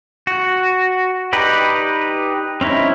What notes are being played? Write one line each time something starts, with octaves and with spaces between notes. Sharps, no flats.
F#4
D#4 G4 B4 D5
C4 C#4 D#4 E4